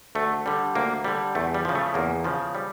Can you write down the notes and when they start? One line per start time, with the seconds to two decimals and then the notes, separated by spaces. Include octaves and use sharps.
0.15 D2 A3
0.46 D3 G3
0.75 D2 A#3
1.04 D3 G3
1.35 E2 A3
1.54 G3
1.65 C#3 F3
1.75 A3
1.94 E2 A#3
2.24 C#3 F3
2.55 G3